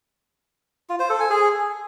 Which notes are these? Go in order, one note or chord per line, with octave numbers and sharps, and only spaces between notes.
F4
C5
A4
G#5
G#4